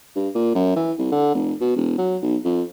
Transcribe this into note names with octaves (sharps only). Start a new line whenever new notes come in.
G2
A#2
F#2
E3
C2
D3
F1
B2
E1
F#3
B1
F2